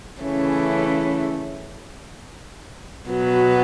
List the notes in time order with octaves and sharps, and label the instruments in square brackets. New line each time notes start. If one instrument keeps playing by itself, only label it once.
[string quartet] C#3 E3 A3 C#4
B2 F#3 B3